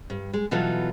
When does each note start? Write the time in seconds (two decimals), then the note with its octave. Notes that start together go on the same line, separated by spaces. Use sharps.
0.10 G2
0.33 G#3
0.51 B2 E3 F#3 F4 A4